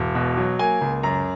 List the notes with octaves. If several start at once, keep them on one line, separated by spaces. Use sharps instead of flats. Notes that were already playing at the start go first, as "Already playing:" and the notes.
Already playing: E1
B2
F#3
A#3 G#5
C#2
F#2 A#5